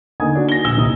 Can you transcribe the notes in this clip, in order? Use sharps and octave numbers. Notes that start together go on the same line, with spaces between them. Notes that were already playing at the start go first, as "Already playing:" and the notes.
D3 A#3 D#4 G#5 D#6 G#6
A#3 D4 F#4
A#6 G7
A#1 E6 G7
C2 A#2 D#4 D#6